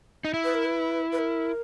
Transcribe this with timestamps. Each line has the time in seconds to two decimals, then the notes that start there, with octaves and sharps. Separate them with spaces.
0.25 D#4
0.34 E4
0.44 B4
0.54 A#4
0.64 B4
1.12 B4
1.18 A#4